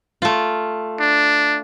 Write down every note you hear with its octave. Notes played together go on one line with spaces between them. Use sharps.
A3 F4
D4